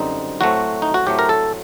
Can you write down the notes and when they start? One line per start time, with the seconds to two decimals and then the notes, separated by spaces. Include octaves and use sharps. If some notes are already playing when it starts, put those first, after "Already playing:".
Already playing: F#2 D3 G3 C4 D#4
0.41 A2 F#3 A3 C4 F#4
0.82 D#4
0.94 F#4
1.07 A2 F#3 A3 C4 G4
1.19 A#4
1.29 A4